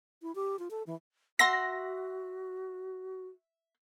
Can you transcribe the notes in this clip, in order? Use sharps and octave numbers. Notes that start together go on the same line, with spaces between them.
E4
G4
F4
A4
E3
F#4 E5 F#5 C6 A#6